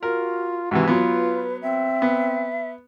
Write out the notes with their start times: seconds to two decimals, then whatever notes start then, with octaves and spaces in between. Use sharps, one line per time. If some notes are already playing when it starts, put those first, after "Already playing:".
0.03 F4 F#4 A#4
0.71 G#2 C3 E3 F#4
0.87 F#3 B3 F4 B4
1.62 C4 E5
2.02 B3